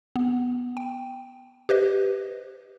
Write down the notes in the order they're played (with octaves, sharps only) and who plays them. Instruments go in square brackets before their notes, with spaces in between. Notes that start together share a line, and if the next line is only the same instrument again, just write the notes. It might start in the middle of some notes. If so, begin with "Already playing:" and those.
[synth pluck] B3
G5
G4 B4 C5 D#5